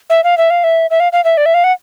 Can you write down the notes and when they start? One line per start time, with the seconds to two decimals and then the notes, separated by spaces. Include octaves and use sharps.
0.10 E5
0.24 F5
0.38 E5
0.50 F5
0.64 E5
0.91 E5
1.00 F5
1.13 F5
1.24 E5
1.37 D5
1.46 E5
1.54 F5
1.64 F#5